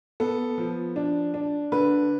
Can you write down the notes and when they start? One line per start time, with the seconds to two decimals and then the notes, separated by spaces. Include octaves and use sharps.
0.20 B3 A4
0.58 F3
0.96 D4
1.34 D4
1.72 D3 B4